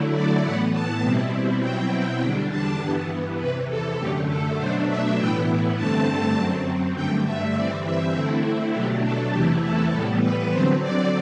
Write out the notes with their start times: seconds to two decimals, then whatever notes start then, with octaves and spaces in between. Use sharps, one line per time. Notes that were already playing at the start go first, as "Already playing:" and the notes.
Already playing: D3 F#3 A3 E4
0.13 D5
0.43 A2 E3 B3 F#5
0.72 A5
1.02 B2 G3 C4 E4
1.61 B2 F#3 C4 E4 G5
2.21 E2 D3 G3 D4
2.50 A5
2.80 G2 E3 B3
3.39 E2 C3 E3 B4
3.69 A4
3.99 F#2 D3 A3 G4
4.29 A4
4.58 B2 F#3 A3 D4 C5
4.88 E5
5.17 A2 E3 B3 E4 G5
5.76 G2 D3 A3 C4 A5
6.36 F#2 F#3 C4
6.95 G2 D3 A3 G5
7.25 E5
7.54 G2 E3 G3 C4 D5
7.84 E5
8.14 D3 A3 C4 E4
8.73 B2 F#3 A3 D4 G4
9.03 A4
9.32 E2 C3 E3 A3 E4 G4
9.62 A4
9.92 A2 E3 G3 B3 A4
10.21 B4
10.51 D3 F#3 C4 C5
10.81 D5